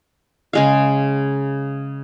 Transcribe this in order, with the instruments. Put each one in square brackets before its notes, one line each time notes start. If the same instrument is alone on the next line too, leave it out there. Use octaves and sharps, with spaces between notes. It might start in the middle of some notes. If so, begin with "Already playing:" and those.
[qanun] C#3 G#3 F5